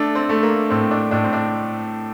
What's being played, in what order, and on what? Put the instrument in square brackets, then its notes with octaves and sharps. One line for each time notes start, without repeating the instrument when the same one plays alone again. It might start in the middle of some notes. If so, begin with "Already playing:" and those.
Already playing: [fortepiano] A3 [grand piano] D4
[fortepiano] C4
[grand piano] A3
[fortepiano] A#3
[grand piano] A2 [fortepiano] C4
[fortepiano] D4
[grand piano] A2 [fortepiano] D4
[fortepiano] C4
D4